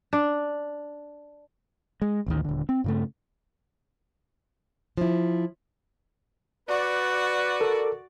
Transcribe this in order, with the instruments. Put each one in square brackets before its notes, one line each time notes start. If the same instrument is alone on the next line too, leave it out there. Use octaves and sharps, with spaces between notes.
[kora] D4
[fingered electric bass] G#3
A1 D2 D#3
D#1 D3
C4
G2 C#3 A3
[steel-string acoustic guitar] F3 E4
[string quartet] F#4 [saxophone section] B4 [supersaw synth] D5
[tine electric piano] A4 A#4